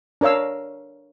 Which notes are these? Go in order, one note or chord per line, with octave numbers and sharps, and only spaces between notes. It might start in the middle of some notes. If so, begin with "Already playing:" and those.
D4 A#4 C#5 F5 E6